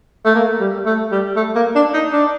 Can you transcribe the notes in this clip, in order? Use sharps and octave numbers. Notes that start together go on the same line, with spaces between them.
A3
A#3
G3
A3
G3
A3
A#3
D4
D#4
D4